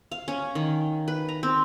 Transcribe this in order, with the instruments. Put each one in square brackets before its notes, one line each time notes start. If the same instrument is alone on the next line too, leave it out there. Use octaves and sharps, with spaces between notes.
[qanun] F5
C#4
D#3
B4
A#5
C4